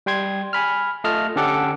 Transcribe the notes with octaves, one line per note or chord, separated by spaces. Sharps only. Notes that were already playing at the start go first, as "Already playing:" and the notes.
G3 G5 C6 G#6
G#5 B5 F6
A3 F4 D#5 A5 F6
D3 C#4 G4 A4 F#5 D6